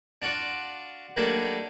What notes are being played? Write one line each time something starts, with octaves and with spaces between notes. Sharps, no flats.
D4 F4 F#4 D5
D#3 F#3 G3 A3 A#3 D4